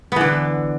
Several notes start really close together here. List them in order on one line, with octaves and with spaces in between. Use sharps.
B3 E3 D3